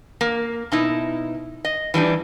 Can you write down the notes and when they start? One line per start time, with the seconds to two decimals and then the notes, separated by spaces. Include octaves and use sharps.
0.21 A#3
0.72 B2 D#4 E4
1.65 D#5
1.94 E3 G3 D4 D#4